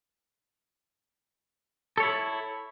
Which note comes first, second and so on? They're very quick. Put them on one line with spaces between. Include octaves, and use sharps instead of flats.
A4 C#5 E4